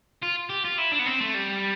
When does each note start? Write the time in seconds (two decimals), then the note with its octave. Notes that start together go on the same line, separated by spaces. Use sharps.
0.22 F4
0.49 G4
0.65 F4
0.78 E4
0.92 D4
0.99 B3
1.06 C4
1.20 A3
1.34 G3